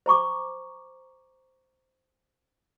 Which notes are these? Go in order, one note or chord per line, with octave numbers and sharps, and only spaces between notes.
C5 A#5 C#6 D6